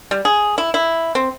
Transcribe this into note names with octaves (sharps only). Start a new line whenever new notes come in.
G3
G#4
E4
E4
C4